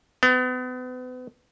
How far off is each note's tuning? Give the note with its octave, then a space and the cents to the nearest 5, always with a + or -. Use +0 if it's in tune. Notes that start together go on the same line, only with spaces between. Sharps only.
B3 +35